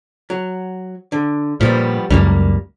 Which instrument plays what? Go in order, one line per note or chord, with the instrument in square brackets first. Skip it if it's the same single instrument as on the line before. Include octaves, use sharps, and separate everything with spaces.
[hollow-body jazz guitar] F#3
D3
[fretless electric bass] A#2 [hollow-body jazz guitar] F3 G3 B3
[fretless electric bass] C#2 F#2 [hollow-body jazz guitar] G3 A#3